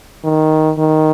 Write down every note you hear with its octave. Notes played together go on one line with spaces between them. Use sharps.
D#3
D#3